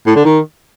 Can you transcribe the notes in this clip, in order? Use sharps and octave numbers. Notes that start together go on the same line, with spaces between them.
A2
D3
D#3